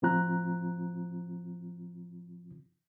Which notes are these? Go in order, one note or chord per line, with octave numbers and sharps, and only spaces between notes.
A2 F3 C4 F4 A#5 F#6